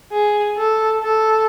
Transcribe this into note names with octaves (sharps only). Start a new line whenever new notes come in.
G#4
A4
A4